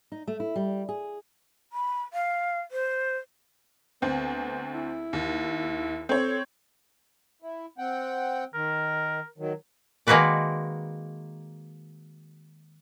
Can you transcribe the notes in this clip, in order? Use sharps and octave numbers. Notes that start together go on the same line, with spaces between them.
D#4
A3
E4
G3
G#4
B5
F5
C5
D2 B3 C4
E4
D#2
C4 A4 C#5
E4
C4 F#5 G5
D#3 A#4
D#3 F#3
D#3 G#3 A#3 F#4 B4 D5